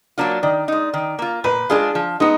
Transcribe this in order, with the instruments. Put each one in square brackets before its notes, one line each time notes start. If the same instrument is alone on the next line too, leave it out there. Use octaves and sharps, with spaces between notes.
[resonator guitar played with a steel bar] F#3 A#3 D4 F4
[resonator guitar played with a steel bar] D#3 [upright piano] D5
[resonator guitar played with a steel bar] G#3 D#4
D#3
A#3 F4
[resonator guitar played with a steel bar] A#2 [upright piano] B4
[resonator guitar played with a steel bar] G#3 D4 F4 [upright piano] G#4
[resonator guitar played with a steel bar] F3
[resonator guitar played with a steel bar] G#3 B3 [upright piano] D#4